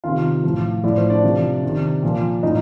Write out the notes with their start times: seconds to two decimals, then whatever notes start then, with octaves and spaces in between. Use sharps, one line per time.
0.04 C3 D#3 F4 F5
0.44 A2 F3
0.84 A2 F3 D5
0.97 C5
1.10 D4 D5
1.24 C3 F3
1.63 C3 D#3
2.03 A#2 F3
2.43 A2 F3 D#4 D#5